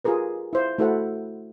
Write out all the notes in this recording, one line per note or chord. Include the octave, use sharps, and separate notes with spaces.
F4 G4 G#4 A#4 B4
E4 C5 F5
A3 E4 F#4 A4 C5 F#5